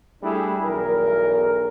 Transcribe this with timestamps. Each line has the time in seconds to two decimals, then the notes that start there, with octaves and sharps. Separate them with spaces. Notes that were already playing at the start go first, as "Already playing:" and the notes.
0.22 G3 A3 D4 E4 G#4
0.64 B1 E2 A#4